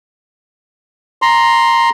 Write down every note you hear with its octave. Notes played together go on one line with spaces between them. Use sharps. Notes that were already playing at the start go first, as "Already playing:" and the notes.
A#5 C6